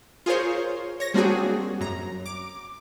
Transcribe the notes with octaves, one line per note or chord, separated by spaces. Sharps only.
F4 G#4 A#4 C5 C#5
C#5 A#6
G3 A#3 C4 D4 F#4 G#4
F#2 A#5
D6